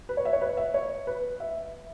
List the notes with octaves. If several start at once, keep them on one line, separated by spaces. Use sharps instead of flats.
B4
C#5
E5
C#5
B4
E5
C#5
B4
E5